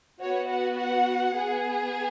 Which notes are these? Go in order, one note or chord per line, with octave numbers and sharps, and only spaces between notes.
B3 F#4 C#5
F#5
F#5
B3 G#4